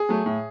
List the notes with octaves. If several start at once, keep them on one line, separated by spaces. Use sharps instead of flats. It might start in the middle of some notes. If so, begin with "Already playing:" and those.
Already playing: G#4
F#3 A3
A2